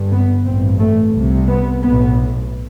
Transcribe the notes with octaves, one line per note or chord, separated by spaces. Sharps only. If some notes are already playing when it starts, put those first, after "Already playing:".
Already playing: G1 G2
B3
A1 G2 C4
A3
C2 C3
B3
B1 A2 B3